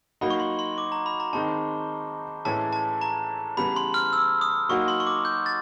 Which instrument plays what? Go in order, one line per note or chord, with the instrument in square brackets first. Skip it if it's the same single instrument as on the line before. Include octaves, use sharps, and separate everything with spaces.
[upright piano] F#3 A#3 D#4 F#4 [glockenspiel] B5
[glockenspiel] C#6
C6
C6
D6
A#5
B5
A#5
[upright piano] D#3 G#3 C4 D#4 [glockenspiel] A5
[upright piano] A2 E3 G#3 C#4 E4 [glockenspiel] A5
[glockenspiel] A5
A#5
[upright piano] C#3 E3 G3 B3 [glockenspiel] B5
[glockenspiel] C6
F6
E6
D#6
[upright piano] F#3 A#3 D#4 F#4 [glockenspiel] C#6
[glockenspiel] C6
C#6
D6
G6
A6